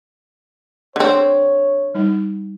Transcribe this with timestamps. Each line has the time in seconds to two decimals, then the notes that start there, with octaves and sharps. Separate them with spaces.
0.96 D3 C4 C#5
1.94 G3 D#4 F#5